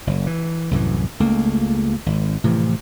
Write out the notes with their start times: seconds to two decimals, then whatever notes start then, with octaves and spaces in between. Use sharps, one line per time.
0.07 F#1
0.27 E3
0.71 C2 F#2 A2 E3
1.20 C#2 A3 A#3
2.06 G#1
2.44 A2 C3 E3 F3